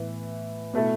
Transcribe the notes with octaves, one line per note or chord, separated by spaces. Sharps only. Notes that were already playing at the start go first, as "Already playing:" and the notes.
Already playing: A2 E3 B3 E4
B2 A3 E4 A4